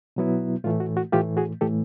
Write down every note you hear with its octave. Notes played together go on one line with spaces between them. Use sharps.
B2 F#3 B3 E4
A2 E3 A3 F4
F#4
F#4
A2 E3 A3 F4 G4
F#4 G#4
A2 E3 A3 G4 A4